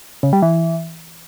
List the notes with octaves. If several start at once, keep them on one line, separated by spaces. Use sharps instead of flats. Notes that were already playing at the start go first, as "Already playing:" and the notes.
C#3
G3
E3